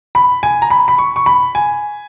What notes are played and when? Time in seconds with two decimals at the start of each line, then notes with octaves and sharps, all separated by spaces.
0.15 B5
0.43 G#5
0.62 A#5
0.70 B5
0.88 B5
0.98 C#6
1.16 C#6
1.26 B5
1.55 G#5